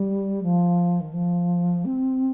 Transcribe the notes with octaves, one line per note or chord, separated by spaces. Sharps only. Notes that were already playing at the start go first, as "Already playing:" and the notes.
Already playing: G3
F3
D#3
F3
C4